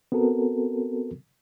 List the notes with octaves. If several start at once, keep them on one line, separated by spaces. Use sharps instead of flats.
B3 C4 F#4 A4 A#4